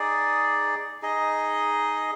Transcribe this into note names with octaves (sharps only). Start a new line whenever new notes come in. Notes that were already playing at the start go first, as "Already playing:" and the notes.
Already playing: D#4 G#4 D5
D#4 G#4 D#5